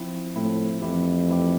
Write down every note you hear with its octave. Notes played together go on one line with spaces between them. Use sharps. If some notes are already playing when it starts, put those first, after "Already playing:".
Already playing: F3 C4 E4
A2 F3 C4 E4
F2 E3 A3 E4 G4
E3 A3 E4 G4